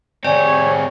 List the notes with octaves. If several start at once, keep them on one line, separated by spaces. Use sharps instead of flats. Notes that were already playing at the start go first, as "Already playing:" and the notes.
C3 C4 G#4 C#5 D5